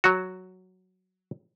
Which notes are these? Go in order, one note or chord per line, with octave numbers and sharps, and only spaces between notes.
F#3 F#4